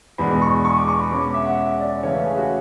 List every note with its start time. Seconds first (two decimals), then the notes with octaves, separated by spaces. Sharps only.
0.18 E2 B2 G#3 D4 B5
0.42 C#6
0.65 C#6
0.76 D6
0.88 C#6
0.99 B5
1.11 B2 G#3 C#4 D6
1.22 D6
1.34 E5
1.45 F#5
1.57 E5
1.80 D5
2.03 C#3 E3 A3 C#4 C#5
2.14 B4
2.25 G#4
2.37 F#4